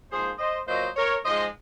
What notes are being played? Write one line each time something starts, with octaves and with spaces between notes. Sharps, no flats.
G#2 F3 A#3 G#4 C5
C5 D#5
A#2 F#3 A#3 C5 D#5
A#4 C#5
G#2 F3 G#3 C5 D#5